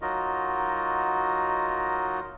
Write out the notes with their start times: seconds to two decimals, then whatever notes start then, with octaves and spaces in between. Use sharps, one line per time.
0.02 F#3 D#4 F4 F#4 A#4 D#5